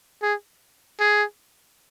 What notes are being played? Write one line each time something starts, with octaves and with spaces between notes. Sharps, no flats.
G#4
G#4